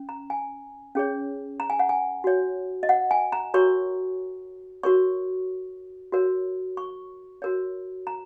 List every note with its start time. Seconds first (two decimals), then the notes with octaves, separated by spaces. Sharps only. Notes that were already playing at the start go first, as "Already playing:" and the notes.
Already playing: C#4
0.09 A#5
0.30 G#5
0.95 C#4 G#4 C#5
1.60 A#5
1.70 G#5
1.79 F#5
1.89 G#5
2.24 F#4 C#5
2.83 D#5
2.89 F#5
3.11 G#5
3.32 A#5
3.54 F#4 A#4 C#5 C#6
4.83 F#4 A#4 C#5 C#6
6.12 F#4 A#4 C#5
6.77 C#6
7.42 F#4 A#4 C#5
8.07 A#5